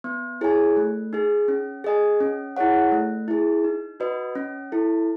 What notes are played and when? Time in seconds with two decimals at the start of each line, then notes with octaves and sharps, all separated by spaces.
0.04 B3
0.41 E4 G#4 C#5 G#5
0.76 A3
1.13 D#4 G#4
1.48 C#4
1.84 G#4 D#5 G#5
2.20 C#4
2.57 E4 G#4 C#5 F#5
2.92 A3
3.28 E4 G#4
3.64 D#4
4.00 F#4 B4 D#5
4.35 C#4
4.72 E4 A4